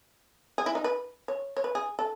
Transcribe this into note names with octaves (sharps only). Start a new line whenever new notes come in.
G#4
E4
D#4
B4
C#5
C#5
B4
G#4
A4